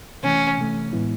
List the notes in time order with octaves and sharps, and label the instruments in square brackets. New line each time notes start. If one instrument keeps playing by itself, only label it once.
[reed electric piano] C3 E3 A3 [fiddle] C#4
[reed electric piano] C3 E3 A3
A2 E3 G#3 B3 E4